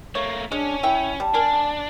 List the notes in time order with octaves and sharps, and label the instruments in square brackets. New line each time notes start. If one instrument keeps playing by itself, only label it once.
[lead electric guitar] A3 A#3 [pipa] C#5
[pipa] G#3 [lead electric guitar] C#4 [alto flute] D4
[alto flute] E4 [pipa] E5 G5
[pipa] G3 [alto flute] A5
[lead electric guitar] D4 [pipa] A#4 G#5